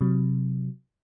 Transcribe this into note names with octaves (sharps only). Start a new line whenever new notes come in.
C3 F#3